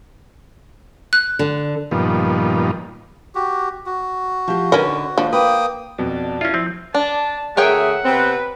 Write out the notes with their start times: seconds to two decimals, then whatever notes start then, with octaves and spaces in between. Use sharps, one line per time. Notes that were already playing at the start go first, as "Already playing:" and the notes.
1.13 F#6
1.39 D3
1.91 G2 A#2 D#3 F3 B3
3.35 F#4 G4
3.86 F#4
4.48 F3 G4
4.72 D3 C#4 D#4 A#4 B4
5.18 D#2 F3 D4
5.33 A#3 B4 G5 D#6
5.98 F2 B2 F#4 D5 A5
6.41 C#4 E4 F4
6.54 F3 C4
6.94 D4 A5
7.57 D2 A3 G#4 A#4 C#5 E5 F#5 G5
8.05 C3 B3 C4 B4